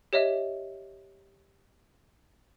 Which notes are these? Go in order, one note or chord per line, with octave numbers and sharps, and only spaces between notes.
G4 C#5 D#5 E5